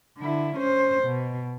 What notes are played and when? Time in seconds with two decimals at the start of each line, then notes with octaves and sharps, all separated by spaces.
0.18 D3 E4
0.56 C#4 C5
1.02 B2